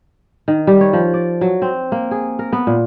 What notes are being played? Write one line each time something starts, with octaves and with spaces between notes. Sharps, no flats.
D#3
G3
C#5
F3
D5
F#3
C4
A#3
G#4
A#4
B3
A#2